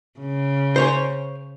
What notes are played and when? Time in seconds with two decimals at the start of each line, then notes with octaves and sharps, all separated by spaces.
0.20 C#3
0.76 C5 C#5 G#5